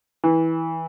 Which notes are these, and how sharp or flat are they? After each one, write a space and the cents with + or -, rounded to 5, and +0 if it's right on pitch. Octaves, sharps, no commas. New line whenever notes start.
E3 -15